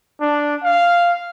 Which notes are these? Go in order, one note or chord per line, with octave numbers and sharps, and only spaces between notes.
D4
F5